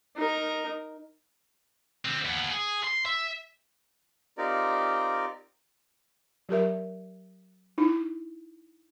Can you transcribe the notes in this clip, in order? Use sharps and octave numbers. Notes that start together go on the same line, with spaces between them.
D#4 A#4
D3 C4
D#2 B3
G#4
C6
E5
C4 D#4 F4 G4 A#4 D5
F#3 G4 A#4 E5
D#4 E4